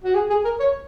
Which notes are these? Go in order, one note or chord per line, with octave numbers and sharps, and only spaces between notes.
F#4
G#4
G#4
A#4
C#5